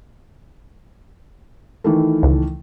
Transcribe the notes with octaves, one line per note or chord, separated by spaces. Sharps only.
D#3 E3 A3
C#2